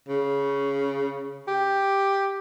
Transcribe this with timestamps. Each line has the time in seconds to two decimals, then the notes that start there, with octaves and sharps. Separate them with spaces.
0.08 C#3
1.48 G4